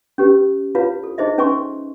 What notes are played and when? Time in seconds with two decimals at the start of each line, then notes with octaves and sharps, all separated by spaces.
0.18 C#4 G4 B4
0.75 E4 F4 B4 C#5 F5
1.04 A4
1.18 D#4 G#4 C5 D#5 E5
1.38 C#4 B4 G#5 C6 C#6